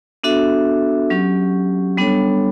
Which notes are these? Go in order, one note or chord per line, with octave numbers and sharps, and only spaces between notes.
B3 D4 F#4 A4 E5
F#3 C#4 G4
G3 B3 D4 A4 C#5